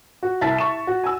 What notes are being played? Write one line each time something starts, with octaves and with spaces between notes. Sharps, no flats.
F#4
C2 E5 A5 A6 B6
C#6 E7
F#4
G#5 E6